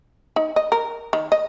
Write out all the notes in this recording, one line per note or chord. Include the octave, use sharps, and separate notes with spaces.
D#4
D#5
A#4
D#3
D#5